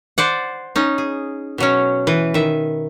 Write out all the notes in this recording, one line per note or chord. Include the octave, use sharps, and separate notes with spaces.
C5 D5 F#5
C#4 D#4
G#4
B2 F#3 C#4
E3 B4
D#3 E5